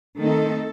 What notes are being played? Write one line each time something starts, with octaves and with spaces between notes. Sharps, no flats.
D#3 A3 C4 D#4 A4